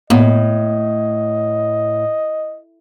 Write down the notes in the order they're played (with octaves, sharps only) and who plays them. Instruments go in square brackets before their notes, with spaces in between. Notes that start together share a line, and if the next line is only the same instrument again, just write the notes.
[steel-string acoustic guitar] A2 [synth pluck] A#3 B3 [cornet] D#5